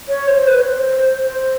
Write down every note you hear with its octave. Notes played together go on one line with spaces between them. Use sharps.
C#5
C5
B4
C#5
C5
C5